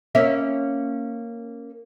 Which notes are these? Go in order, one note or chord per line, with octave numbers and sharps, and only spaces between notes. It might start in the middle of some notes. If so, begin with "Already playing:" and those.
A#3 C#4 E5